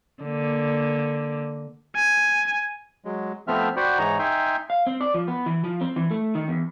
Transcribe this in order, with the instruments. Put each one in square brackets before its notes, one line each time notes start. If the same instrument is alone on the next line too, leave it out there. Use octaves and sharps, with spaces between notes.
[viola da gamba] D3 A#3
[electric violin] G#5
[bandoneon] F#3 G#3
F3 A3 B3 C4 E5 F6
F#4 C5 D5 F#5 G5 B5
G#2 E3 D#4 C#5 A#5
D#4 E5 G5 G#5 C6
[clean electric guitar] F5
C4
D5
F3
B3
E3
F3
C4
E3
A3
D#3
E2